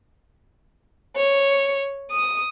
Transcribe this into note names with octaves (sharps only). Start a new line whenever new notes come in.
C#5
D#6